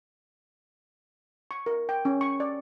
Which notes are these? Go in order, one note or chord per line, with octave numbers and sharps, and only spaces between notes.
C#6
A#4
G5
C#4
C#6
D5